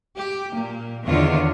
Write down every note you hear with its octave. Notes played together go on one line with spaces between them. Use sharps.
G4
A#2 A#3
E2 D3 D#3 A#3 F4 C#5